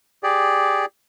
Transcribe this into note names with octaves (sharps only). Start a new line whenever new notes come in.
G4 G#4 D5